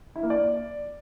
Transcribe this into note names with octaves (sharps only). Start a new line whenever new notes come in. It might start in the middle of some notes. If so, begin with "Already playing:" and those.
E4
A#3
D5